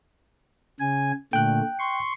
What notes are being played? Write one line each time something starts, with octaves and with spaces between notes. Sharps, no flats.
C#3 G#5
A#2 D3 A3 G5 F#6
C6 C#6